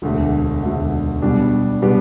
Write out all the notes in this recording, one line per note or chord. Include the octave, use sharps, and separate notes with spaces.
E1 D2 D3 A3
E1 D2 D3 A3
B2 G3 B3 D4 G4
B2 G3 B3 D4 G4